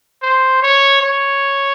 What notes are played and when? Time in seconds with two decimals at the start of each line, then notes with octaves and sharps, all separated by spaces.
0.22 C5
0.62 C#5
1.01 C#5